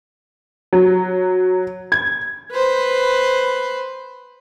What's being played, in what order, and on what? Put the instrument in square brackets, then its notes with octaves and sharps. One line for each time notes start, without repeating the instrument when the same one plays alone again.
[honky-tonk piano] F#3
G#6
[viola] B4 C5